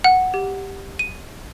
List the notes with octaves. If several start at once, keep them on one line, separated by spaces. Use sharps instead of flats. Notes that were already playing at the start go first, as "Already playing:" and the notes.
F#5
G4
D#7